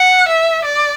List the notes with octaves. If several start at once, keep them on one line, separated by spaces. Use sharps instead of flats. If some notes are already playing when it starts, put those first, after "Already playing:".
Already playing: F#5
E5
D5